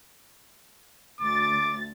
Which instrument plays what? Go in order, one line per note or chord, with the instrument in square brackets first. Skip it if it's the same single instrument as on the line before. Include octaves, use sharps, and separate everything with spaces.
[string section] D2 A6 [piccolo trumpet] D6